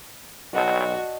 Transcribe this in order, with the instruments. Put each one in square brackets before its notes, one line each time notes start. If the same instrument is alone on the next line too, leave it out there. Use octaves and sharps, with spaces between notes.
[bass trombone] B1 [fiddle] F#4 [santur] D5 D#5 A5